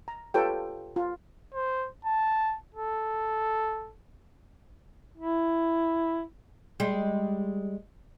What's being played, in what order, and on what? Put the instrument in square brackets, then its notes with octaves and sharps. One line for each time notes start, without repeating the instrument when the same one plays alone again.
[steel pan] A#5
F4 G4 A4 B4 C#5 G5
F4
[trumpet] C5
A5
A4
[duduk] E4
[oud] G3 G#3